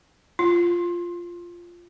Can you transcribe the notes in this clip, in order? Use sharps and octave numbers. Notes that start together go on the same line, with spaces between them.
F4